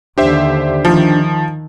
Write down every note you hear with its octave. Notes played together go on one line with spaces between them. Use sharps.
D#2 D3 D4 G4 C5 E5
D#3 F3